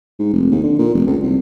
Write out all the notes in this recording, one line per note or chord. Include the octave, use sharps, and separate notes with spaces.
G#2
F1
D#2
D3
A#2
F1
C#2
C2